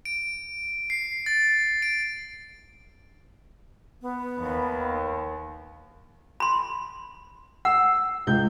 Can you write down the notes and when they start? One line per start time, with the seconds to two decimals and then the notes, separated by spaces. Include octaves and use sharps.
0.05 D7
0.90 C7
1.26 A6
1.82 D7
4.02 B3
4.39 D#2
6.40 B5 C6
7.65 F#5 E6
8.27 C#2 G6